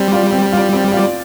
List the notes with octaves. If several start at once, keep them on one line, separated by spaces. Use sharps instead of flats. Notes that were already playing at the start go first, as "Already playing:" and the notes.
Already playing: G3 C4
F4 D5
C4
F4 D5
C4
F4 D5